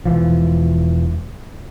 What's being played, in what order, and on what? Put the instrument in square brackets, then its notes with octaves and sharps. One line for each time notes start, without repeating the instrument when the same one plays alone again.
[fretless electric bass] E1 E3 F3